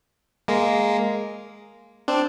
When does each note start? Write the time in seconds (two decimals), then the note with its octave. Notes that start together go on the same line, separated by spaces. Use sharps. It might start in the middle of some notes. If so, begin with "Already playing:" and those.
0.48 G#3 A#3
2.08 C4 D4